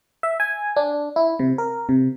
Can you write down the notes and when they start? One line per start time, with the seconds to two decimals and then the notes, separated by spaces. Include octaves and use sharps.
0.23 E5
0.40 G#5
0.76 D4
1.16 E4
1.39 C3
1.58 A#4
1.89 C3